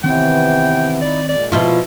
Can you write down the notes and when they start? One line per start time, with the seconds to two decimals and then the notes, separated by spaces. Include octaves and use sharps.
0.04 C3 D#3 E3 B3 C4 C#5 G5
1.02 D#4 E4 D5
1.29 A#2 G#3 D5
1.52 B2 F3 E4 F4